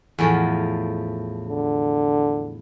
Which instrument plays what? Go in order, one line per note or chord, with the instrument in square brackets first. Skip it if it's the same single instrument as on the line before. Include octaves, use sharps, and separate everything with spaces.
[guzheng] E2 A2 F3
[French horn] D3